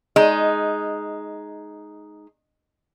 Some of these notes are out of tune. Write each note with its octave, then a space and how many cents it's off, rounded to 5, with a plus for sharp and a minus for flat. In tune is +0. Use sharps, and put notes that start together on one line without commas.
G#3 +10 D#4 +0